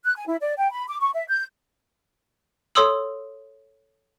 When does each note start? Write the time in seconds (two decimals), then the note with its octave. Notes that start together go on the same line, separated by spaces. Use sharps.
0.04 F#6
0.16 G#5
0.27 E4
0.41 D5
0.57 G5
0.71 B5
0.88 D6
1.00 C#6
1.14 E5
1.28 G6
2.75 A4 C#5 C6 D#6 E6 F#7